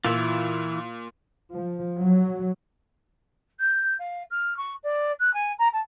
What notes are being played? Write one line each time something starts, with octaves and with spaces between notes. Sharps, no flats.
A#2 E3 E4 F4
F3
F#3
G6
F5
F6
C#6
D5
F#6
G#5
A#5
A5